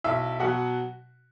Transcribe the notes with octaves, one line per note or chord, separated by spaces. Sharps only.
B1 E4 E5
B2 F#3 F#4 F#5